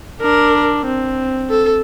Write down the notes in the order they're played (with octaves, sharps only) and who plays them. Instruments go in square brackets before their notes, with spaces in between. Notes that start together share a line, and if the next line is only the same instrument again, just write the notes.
[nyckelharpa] D4 [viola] A#4
[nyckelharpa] C4
[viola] A4